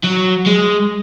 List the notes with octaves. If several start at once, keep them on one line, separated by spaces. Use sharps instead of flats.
F#3
G#3